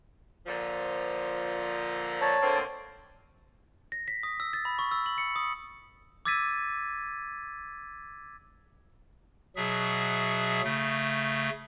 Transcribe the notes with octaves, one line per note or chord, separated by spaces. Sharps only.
A#2 D3 F3
C#5 A5
D3 A#3 C4
A#6
B6
D#6
E6
A6
B5
C#6
E6
F#7
C#7
D#6
D6 E6 G#6 A6 B6 D#7
B2 F#3 G#4 E5
C#3 A3